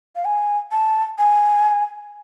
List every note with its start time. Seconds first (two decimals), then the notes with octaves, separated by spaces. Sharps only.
0.16 F5
0.25 G#5
0.72 A5
1.18 G#5